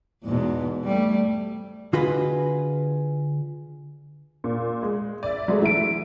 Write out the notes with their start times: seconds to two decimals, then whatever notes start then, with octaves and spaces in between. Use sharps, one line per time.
0.24 E2 G#2 B2
0.85 G3 A3
1.93 D3 F4 F#4 G#4 B4 D#5
4.44 A#2
4.83 G#3
5.23 D5 E5
5.48 F#3 G#3 A3
5.62 E3 E5 D7